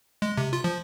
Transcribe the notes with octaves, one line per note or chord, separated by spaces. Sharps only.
G#3
C3
F4
F3